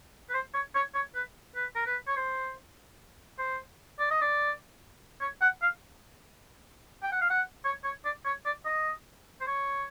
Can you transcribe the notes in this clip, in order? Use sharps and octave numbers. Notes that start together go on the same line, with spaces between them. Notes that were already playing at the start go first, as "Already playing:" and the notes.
B4
C5
C#5
C#5
C#5
B4
B4
A#4
B4
C#5
C5
C5
D5
D#5
D5
C#5
F#5
F5
G5
F#5
F5
F#5
C#5
C#5
D5
C#5
D5
D#5
C5
C#5